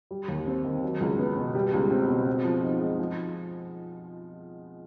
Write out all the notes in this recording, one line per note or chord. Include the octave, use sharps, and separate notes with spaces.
G3
D#2
C4
D#3
F#3
C#2
B3
B2
G3
C#2
C4
B2
C4
F3
D#4
G#3
F3